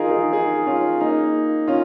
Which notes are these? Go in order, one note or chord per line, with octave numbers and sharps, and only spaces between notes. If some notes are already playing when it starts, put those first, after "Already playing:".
Already playing: D#4 F4 G#4 A#4
D#4 G#4
D#4 G#4
C#4 F4
A#3 D#4
C#4 F4